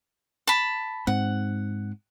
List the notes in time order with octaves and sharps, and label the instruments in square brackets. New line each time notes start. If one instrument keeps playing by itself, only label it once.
[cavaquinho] A5 B5
[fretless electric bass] G#2 C4 [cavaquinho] F#5